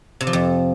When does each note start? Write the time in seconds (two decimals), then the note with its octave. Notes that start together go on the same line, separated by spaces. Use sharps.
0.21 C3
0.27 F3
0.33 F2